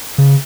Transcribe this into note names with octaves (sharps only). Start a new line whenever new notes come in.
C#3